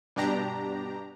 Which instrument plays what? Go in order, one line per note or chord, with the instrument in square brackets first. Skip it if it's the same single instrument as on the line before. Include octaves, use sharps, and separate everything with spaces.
[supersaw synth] G2 B2 D4 G4 A#5